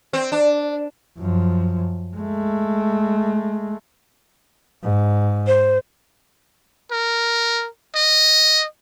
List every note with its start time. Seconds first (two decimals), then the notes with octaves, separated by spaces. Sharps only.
0.13 C4
0.32 D4
1.18 F#2 F3
2.17 G#3 A3
4.83 G#2
5.47 C5
6.91 A#4
7.95 D#5